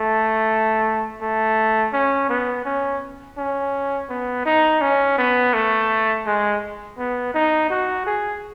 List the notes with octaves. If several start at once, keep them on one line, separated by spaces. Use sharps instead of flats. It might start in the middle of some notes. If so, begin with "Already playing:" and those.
Already playing: A3
A3
C#4
B3
C#4
C#4
B3
D#4
C#4
B3
A3
G#3
B3
D#4
F#4
G#4